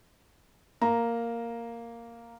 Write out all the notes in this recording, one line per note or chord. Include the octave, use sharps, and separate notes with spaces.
A#3 A#5